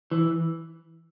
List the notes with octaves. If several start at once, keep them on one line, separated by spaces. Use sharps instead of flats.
E3